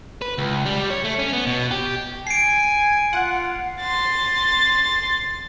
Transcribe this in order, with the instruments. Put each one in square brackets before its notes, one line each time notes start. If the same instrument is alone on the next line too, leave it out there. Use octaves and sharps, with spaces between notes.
[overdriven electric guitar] B4
C#2
G3
C#5
A3
C#4
B3
B2
G4
[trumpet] G#5 [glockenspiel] C7 D7
[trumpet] F4 [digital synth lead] F#5
[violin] C6 A6